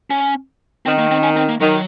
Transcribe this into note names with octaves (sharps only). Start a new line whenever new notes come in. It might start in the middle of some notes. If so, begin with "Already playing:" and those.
C#4
D#3 C4
A#3
C4
C#4
C4
A#3
D#3 F#3